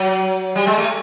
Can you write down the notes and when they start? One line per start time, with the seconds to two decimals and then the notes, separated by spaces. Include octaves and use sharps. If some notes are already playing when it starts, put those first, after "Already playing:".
Already playing: F#3
0.55 G3
0.67 G#3
0.77 A3